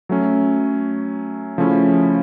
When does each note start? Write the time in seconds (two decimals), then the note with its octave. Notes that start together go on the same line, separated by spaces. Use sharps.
0.09 F#3 A3 C#4
1.58 C#3 F3 A3 C#4 E4